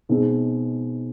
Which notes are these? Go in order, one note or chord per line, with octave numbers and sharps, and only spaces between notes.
B2 G#3 C4 D#4 G#4